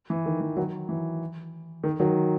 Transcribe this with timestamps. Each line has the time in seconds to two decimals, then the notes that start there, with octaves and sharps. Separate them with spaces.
0.10 E3
0.26 D#3
0.41 E3
0.57 D#3 F#3
0.89 E3
1.84 D#3
2.00 D#3 F#3